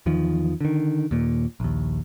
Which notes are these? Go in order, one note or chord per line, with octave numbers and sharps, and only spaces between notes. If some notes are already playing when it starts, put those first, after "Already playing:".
E2 D#3 F3
D3 D#3
D#2 A#2
A#1 D#2